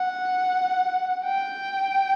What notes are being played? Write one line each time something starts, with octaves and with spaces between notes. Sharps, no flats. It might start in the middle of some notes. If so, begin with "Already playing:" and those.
Already playing: F#5
G5